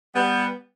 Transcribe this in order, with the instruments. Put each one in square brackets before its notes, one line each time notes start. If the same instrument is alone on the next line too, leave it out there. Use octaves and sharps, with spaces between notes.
[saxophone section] G3 B3